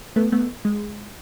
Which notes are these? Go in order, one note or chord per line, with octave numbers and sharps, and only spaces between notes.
A3 B3
A3 B3
G#3